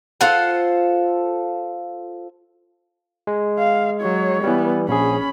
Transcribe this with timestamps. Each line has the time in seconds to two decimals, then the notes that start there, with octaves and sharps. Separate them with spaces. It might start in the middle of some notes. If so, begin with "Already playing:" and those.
0.21 F4 A4 C5 F#5
3.27 G#3
3.59 F5
4.01 F#3 C#5
4.44 E3 G3 B3
4.88 A#1 C#4 G#4 B5